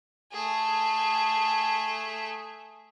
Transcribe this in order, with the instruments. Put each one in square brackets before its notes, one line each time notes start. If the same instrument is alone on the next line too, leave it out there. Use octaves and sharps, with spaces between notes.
[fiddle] A3 G#4